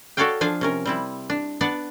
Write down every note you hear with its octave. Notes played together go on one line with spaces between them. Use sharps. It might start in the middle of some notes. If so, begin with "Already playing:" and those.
F#4 A4 C#5 D5 F5 G5
F3 D4 F5 G#5
C3 C#4 A#4
G3 C4 E4
D4
B3 D4 D5 F#5